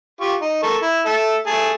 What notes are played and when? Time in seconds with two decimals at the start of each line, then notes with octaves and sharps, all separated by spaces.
0.21 F4 G4 C#6
0.41 D#4
0.63 A4 A#4 C#6
0.82 E4
1.06 A4 E5
1.47 A3 G#4 A5